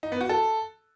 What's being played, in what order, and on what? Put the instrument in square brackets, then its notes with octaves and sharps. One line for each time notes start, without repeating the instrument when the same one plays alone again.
[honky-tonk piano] D#4
B3
F#4
A4